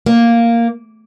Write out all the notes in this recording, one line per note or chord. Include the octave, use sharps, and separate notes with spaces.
A#3